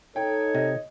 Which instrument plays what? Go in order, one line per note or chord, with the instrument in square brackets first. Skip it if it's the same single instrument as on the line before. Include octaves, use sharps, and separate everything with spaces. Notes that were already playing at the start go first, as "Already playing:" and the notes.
[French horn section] D#4 A4 [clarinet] C#5 [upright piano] G5
[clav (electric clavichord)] C3 [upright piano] D#5